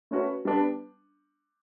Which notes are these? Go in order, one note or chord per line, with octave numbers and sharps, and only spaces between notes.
A3 C#4 F#4 B4
G3 B3 D4